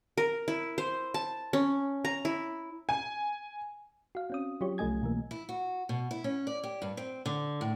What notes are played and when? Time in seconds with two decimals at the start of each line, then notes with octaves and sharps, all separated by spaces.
0.17 A#4
0.48 E4
0.78 C5
1.14 A5
1.53 C#4
2.05 A#5
2.25 E4
2.89 G#5
4.15 F#4 F5
4.30 C4 C#4 D#6
4.61 F#3 F4 G4 C#5
4.78 C2 F3 A3 D#5 G#5 G#6
5.02 B2 E3 A#3
5.31 E4
5.49 F#4
5.89 B2
6.11 E4
6.24 C#4
6.47 D5
6.63 G4
6.82 G2
6.97 C4
7.26 D3
7.61 A2